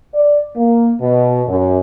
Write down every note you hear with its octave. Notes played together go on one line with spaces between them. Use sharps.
D5
A#3
B2
F#2